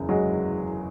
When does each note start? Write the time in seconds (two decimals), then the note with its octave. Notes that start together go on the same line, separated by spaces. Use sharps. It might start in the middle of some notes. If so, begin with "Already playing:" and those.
Already playing: F#1 E2 C#3
0.09 F#3 G#3